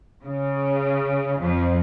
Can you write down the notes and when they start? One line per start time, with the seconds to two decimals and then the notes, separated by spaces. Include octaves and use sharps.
0.24 C#3
1.40 F2